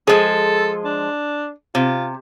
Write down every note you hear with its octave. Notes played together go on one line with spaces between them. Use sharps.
F3 G#3 G#4 A4
D4
C3 F4